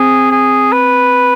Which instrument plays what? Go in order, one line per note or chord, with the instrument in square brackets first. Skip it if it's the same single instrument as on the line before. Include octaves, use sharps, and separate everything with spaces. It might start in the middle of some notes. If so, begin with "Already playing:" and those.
Already playing: [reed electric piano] C4 [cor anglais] G#4
[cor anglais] G#4
B4